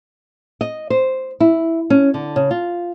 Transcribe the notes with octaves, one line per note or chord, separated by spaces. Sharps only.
D#5
C5
E4
C#4
D3
C#3
F4